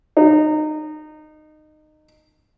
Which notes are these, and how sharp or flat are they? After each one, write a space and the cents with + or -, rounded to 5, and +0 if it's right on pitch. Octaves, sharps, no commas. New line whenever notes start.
D#4 -20